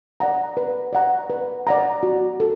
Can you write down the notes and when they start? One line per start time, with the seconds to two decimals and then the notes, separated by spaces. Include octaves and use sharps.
0.20 D5 F#5 A#5
0.57 B4
0.93 D5 F#5 A#5
1.30 B4
1.67 D5 F#5 A#5
2.03 F#4
2.40 A4